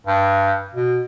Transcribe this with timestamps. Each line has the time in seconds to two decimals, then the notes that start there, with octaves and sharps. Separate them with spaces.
0.07 G2
0.74 B2